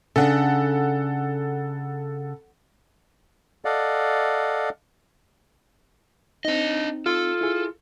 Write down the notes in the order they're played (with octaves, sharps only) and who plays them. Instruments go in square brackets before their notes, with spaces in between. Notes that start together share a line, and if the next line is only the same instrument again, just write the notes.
[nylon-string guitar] C#3 D4 [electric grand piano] A4 F#5
[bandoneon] A4 D5 D#5 F5 F#5
[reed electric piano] C4 D#4 [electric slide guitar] D4 D#5
[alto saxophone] F4 [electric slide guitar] A4
[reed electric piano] E4 G#4